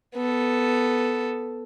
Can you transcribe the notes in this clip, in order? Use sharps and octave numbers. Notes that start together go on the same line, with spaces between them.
B3 A4